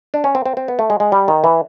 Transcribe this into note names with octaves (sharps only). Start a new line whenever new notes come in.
D4
C#4
C4
C4
C4
B3
A3
G#3
G#3
G3
D#3
E3